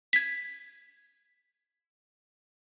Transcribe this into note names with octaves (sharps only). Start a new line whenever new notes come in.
G#6 B6